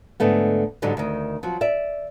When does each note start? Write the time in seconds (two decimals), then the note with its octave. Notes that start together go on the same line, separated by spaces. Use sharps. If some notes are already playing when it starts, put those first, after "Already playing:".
0.20 G#2 D3 A3 B3
0.82 G#2 D3 F#3 G3 D#4
0.97 D2 D#3
1.43 F3 F#3
1.61 D5 E5